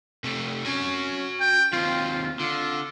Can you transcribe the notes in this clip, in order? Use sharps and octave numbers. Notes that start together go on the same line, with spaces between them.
C3 A3
C#4 F#4 G#5
G5
D#2 C4 F4
D3 F4